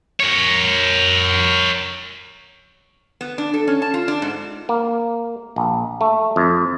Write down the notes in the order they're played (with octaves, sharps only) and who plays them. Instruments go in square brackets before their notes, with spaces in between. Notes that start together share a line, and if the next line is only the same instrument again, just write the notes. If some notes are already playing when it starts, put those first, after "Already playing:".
[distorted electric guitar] A#4 C#5
[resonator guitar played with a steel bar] B3
D4
A4
C#4
A5
F4
D4
G#2
[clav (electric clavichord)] A#3
A#1
A3
F2